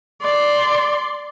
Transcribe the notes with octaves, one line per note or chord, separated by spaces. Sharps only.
D5 C6